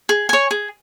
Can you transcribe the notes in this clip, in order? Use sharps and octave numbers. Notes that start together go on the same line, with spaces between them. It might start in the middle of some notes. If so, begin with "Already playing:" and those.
G#4
C#5 G#5
G#4